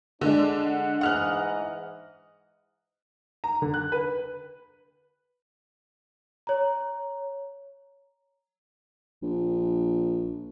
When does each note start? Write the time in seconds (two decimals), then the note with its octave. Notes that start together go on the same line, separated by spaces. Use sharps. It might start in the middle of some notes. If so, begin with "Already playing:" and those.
0.21 D3 G#3 D4
0.66 F#5
1.01 G#2 E3 D#5 F#5 F6 F#6
3.44 A#5
3.62 D3
3.74 F#6
3.92 B4
6.47 C#5 A#5
9.22 A#1